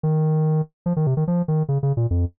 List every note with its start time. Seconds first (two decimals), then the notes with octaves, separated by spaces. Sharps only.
0.03 D#3
0.86 F3
0.96 D#3
1.07 C3
1.17 D#3
1.28 F3
1.48 D#3
1.69 C#3
1.83 C#3
1.97 A#2
2.11 F2